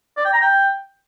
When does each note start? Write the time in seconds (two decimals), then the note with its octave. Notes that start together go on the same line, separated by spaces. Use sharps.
0.17 D5
0.25 G5
0.33 A#5
0.41 G5